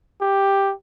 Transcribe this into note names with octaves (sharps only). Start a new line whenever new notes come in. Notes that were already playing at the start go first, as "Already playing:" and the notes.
G4